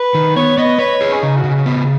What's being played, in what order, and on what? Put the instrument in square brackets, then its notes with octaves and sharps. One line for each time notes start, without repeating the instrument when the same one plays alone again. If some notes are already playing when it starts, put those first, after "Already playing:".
Already playing: [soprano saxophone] B4
[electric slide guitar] D#3
[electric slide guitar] B3 [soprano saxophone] C#5
[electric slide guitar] B3 [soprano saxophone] D#5
[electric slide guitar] B4 [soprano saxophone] C#5
[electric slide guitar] G#4
[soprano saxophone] C#4
[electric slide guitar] C#3 [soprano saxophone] D#4
[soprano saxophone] F#4
[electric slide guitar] C#3
B3